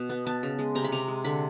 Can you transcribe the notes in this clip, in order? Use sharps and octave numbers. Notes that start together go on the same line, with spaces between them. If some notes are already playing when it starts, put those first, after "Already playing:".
Already playing: B2
B3
B3 A5
C#3
G#3
C3 A#5
B5
C3 A#5
G#3
D3 B5